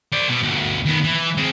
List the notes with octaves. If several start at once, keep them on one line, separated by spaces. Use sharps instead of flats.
C5 D5
B2
D2 B2
D#3 B3
E3
G#3 C4